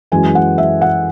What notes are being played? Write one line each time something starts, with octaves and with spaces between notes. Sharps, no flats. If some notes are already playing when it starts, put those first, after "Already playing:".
F#2 E3 G#3 G#5
F#5
E5
F#5